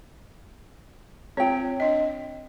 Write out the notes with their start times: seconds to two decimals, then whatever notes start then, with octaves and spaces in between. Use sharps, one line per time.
1.37 C4 F4 C#5 G5
1.80 D4 D#5